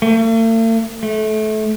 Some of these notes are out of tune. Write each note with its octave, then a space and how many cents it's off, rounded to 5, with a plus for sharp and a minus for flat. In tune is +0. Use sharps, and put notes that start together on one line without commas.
A3 +45
A3 -25